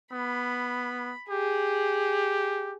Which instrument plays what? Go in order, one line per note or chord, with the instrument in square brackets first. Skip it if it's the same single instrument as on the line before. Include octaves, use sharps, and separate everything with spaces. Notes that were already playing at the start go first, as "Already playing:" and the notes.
[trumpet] B3 [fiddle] B5
[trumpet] G4 [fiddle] G#4